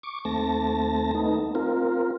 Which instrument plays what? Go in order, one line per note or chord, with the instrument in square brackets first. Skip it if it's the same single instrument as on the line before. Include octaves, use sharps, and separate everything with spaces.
[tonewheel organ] C#6 D6
D#2 A3 C4 A5 A#6
A3 B3 D#4
C4 F4 A#4